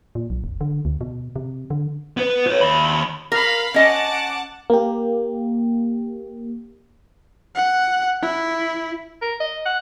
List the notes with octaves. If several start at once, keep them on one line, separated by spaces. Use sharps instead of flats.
A#2
B1
F1
D3
D2
B2
C3
D3
B3 B4
B4 C#5
D#2 B5
A#4 F5 B5
C#4 D#5 F#5 A5 D6
A#3 G4
F#5
E4
A#4
D#5
F#5